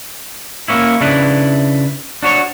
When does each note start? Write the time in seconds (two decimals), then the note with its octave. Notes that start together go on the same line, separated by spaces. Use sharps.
0.68 A#3 C#4 E4
1.01 C#3 D4 E4 B4
2.23 D4 F#4 C#5